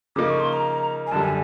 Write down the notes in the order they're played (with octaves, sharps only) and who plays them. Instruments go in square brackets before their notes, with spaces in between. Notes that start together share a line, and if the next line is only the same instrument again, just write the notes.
[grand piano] C#3 F3 A#3 D#4 [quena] D6
[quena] C#6
C6
A#5
G#5
[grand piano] F#2 D3 G3 [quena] A5
[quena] G#5